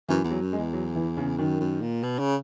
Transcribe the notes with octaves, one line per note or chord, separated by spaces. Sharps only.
F#2 E3
E2
F#3
F#2
G#3
E2
F#3
E3
C#3
F#2 D#3
F#2
A#2
B2
C#3